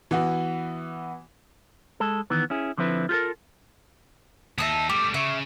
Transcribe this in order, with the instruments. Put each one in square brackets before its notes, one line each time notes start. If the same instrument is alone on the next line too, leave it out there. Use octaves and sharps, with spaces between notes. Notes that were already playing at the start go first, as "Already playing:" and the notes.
[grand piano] E3 B3 F#4
[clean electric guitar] G#3 A4
D#3 E3 B3
C#4 E4 G#4
D3 F3 C4 E4 B4
F4 G4 A4 A#4
[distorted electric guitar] D#2 D#4 [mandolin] E5 A5 D#6
[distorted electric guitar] G3 A3 [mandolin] G4
[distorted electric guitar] C#3 [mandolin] E5 C#6